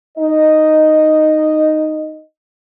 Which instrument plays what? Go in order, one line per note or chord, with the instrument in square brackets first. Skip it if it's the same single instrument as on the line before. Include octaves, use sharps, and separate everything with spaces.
[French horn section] D#4 D#5